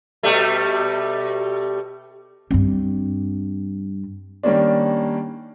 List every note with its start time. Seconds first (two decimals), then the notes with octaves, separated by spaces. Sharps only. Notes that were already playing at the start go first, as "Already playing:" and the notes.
0.23 B2 G3 A3
2.51 G2 C4
4.43 D#3 G3 A#3 C#4 D4